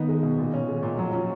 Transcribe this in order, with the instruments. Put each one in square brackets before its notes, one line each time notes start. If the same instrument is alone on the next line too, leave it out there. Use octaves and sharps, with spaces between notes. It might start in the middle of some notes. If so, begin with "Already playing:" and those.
Already playing: [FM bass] D#3 [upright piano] B3 D#4
[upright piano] G#3
B2
A#2
C#4
G#3
A#2
[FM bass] F3 [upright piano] F#3
[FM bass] F3 [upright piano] C#4